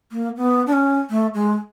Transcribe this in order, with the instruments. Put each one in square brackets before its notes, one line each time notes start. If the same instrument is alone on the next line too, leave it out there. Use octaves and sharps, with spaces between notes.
[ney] A#3
B3
D4
C#4
A3
G#3